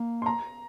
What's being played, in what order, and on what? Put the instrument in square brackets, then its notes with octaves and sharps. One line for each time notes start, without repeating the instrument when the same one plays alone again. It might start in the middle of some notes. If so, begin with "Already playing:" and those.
Already playing: [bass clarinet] A#3
[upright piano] C6
A#5